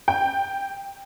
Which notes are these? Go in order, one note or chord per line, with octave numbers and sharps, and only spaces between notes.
G5